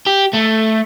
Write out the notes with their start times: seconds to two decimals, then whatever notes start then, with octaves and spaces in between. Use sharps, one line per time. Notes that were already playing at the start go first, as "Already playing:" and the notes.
0.07 G4
0.34 A3